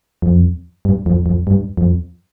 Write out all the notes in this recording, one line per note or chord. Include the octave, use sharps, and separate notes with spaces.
F2
G2
F2
F2
G2
F2